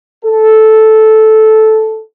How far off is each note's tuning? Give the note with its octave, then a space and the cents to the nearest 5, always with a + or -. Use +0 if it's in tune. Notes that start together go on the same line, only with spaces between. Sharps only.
A4 -10